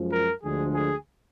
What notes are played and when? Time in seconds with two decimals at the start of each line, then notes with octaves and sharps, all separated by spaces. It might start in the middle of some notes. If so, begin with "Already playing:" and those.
Already playing: F#2 F3 G#3
0.11 A#4
0.43 D2 D3 F3 G#3 G#4
0.74 G#4